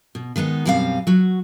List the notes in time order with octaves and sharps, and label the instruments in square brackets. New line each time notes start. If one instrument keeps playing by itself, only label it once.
[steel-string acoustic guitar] B2
D#3 G#3 B3 D#4
F#2 B2 G3 C4 C#4 F5
F#3 F#4